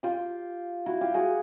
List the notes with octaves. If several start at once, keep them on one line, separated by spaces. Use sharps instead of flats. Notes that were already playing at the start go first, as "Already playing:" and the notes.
F4 G4
E4 F#4
F4 G4
F#4 G#4